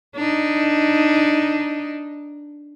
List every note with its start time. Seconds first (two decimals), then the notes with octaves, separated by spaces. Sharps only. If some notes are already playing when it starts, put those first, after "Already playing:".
0.16 D4 D#4